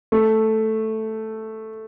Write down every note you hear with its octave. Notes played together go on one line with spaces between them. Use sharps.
A3